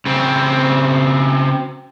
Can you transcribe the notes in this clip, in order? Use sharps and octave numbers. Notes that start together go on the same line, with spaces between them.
C#3 C4